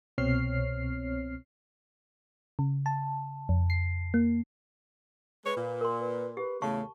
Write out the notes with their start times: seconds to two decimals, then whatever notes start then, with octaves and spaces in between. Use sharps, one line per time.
0.18 C2 B2 C4 C#5 F6 C7
2.59 C#3
2.86 A5
3.49 F2
3.70 C7
4.14 A#3
5.45 G#3 B4 C#5
5.57 A#2
5.81 A#4 C6
6.00 B4
6.37 G4 B4
6.62 E2 A2 C#3 A3 A5 C#6